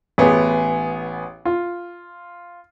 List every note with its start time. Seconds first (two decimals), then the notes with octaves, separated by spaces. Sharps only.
0.18 A1 B3 G#4
1.45 F4